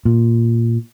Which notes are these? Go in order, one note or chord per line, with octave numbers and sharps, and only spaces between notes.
A#2